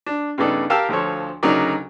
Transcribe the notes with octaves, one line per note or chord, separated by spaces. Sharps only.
D4
G2 C#3 B3 D#4 A4 D5
G4 A#4 F5 G5 A5 E6
D2 F3 F4 A4 C#5
D2 C#3 F#3 D#4 A#4 D5